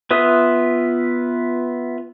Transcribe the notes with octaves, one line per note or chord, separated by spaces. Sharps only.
B3 F4 B4 E5 D#6